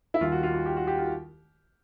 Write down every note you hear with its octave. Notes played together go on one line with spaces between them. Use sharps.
E4
D#2 D#3 G3 F4
F#4
F4
F#4
G4
F#4
G4
F4